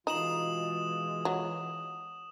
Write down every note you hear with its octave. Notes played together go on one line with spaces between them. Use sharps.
B2 E3 G#3 D#4 F4 D#6 E7 F#7
F#3